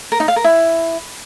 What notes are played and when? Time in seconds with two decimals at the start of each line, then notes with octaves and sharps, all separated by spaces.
0.12 A#4
0.20 D#4
0.28 F5
0.36 A#4
0.44 E4